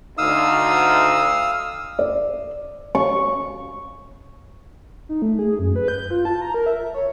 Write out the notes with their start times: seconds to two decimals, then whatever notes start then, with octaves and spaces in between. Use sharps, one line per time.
0.18 D2 D#4 F5 D#6 E6
1.99 D5
2.95 C#6
5.09 D#4
5.22 A3
5.39 G#4
5.59 F#2
5.76 B4
5.88 G6
6.11 F4
6.25 A5
6.42 A#5
6.54 A#4
6.66 E5
6.94 C#5